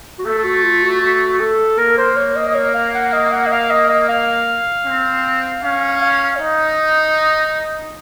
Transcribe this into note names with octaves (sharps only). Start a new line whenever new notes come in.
F#4
A3 A4
A4
F#4
F4
F#4
F#4
A4
A#3 A#4
C5
C#5
D#5
D#5
C#5
F5
F#5
D#5
F#5
D#5
F5
D#5
D#5
F5
C4
C#4 F5
F5
C#5
D#4 D#5